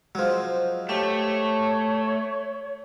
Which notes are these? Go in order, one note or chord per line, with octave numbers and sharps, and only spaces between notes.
F3 F#3 G#3 C5
A3 G4 C#5